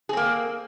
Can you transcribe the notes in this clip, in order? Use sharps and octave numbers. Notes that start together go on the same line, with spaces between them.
A#3 C4 G#4